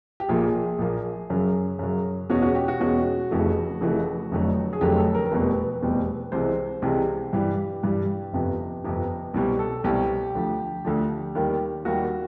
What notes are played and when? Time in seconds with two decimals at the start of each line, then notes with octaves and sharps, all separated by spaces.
0.20 G4
0.29 A#1 A#2 F3 A#3 G#4
0.79 A#1 A#2 F3 A#3
1.30 F#2 C#3 F#3
1.79 F#2 C#3 F#3
2.30 E2 B2 G#3 C#4 F#4
2.42 F#4
2.55 G4
2.68 F#4
2.80 E2 B2 G#3 C#4 F#4
3.31 F1 F2 C#3 E3 A3
3.81 F1 F2 C#3 E3 A3
4.31 F1 F2 D3 F#3 A3
4.73 G#4
4.81 F1 F2 D3 F#3 A3 G4
4.98 A4
5.15 A#4
5.25 A#4
5.31 F1 E2 B2 G3 C4 B4
5.82 F1 E2 B2 G3 C4
6.32 C2 C3 E3 G#3 C4 C5
6.82 C2 C3 E3 G#3 C4
7.33 G2 E3 G3 G4
7.83 G2 E3 G3
8.33 G1 F2 C3
8.84 G1 F2 C3
9.34 C2 B2 G3 C4
9.59 A4
9.84 C2 B2 G3 C4 G4
10.35 D2 D3 F3
10.85 D2 D3 F3
11.35 D#2 D#3 G3
11.85 D#2 D#3 G3 F#4